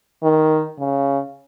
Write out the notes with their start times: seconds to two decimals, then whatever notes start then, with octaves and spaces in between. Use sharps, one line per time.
0.23 D#3
0.79 C#3